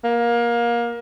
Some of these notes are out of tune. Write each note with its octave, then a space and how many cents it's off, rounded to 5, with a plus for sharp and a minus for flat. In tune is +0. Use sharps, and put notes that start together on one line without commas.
A#3 +25